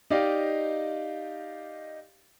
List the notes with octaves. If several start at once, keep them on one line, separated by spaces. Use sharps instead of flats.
D#4 G4 D5 D#5 F5